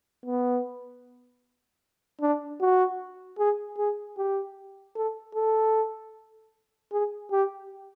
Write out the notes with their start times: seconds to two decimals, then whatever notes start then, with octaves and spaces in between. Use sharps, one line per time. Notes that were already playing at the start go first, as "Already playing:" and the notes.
0.25 B3
2.21 D4
2.61 F#4
3.39 G#4
3.78 G#4
4.18 G4
4.95 A4
5.35 A4
6.92 G#4
7.31 G4